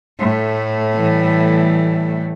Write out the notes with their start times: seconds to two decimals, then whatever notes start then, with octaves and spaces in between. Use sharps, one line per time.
0.19 A2 A3
0.94 E3 G3